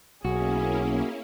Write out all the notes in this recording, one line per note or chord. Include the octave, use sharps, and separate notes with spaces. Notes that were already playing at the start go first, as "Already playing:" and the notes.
B1 A#3 C#4 E4 F#4 G#4